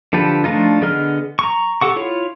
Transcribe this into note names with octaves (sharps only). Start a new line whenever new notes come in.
D3 F3 G4 A4 B4
F3 A3 D4 D#4 F4
D3 B3 G#4 D#5 F6
A#5 C#6
G4 A4 F#5 C#6
E4 F4 C#5